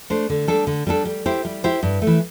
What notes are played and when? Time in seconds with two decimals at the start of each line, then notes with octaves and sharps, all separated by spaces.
0.10 A3 D4 C5
0.30 D3
0.48 G3 D4 A4
0.67 D3
0.87 G3 D4 A4
1.05 G3
1.26 E4 G4 C5
1.45 G3
1.64 E4 G4 C5
1.83 G2
2.02 A3
2.07 E3